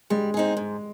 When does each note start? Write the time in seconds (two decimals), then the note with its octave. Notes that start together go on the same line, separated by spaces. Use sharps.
0.10 G3 G#3
0.34 C4 D#4 G#4
0.57 G#2